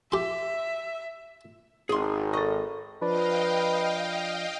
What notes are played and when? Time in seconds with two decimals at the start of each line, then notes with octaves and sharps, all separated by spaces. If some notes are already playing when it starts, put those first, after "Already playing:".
0.12 G4 E5 C6
1.89 G#1 G#4 C6
2.33 A4 D#5 C#6
3.02 F3 D4 B4 D5 D#5 F5 G5